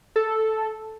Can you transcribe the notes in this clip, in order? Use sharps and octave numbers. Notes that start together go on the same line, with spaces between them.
A4